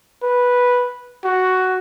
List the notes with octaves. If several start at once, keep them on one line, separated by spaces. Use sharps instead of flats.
B4
F#4